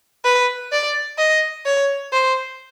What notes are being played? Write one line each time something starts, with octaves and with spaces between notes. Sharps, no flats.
B4
D5
D#5
C#5
C5